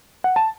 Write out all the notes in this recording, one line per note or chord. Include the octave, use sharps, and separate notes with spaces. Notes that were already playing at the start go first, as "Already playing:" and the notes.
F#5
A5